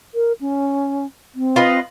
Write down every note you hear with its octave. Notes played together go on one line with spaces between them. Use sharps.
A#4
C#4
C4
F4 B4 D#5